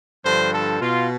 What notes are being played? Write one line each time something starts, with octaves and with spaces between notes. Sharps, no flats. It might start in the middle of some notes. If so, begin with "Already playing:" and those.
G2 D3 F3 C5
A4
B2 F4